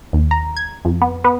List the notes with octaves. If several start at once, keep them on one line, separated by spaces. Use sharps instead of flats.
D#2
A#5
G#6
F2
B3
B3